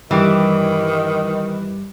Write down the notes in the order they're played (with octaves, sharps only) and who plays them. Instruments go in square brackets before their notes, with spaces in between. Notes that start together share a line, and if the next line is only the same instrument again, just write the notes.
[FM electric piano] G2 G3 D6 [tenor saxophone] D#3 [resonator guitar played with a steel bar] E3